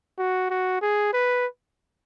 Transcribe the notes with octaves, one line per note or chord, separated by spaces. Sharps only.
F#4
F#4
G#4
B4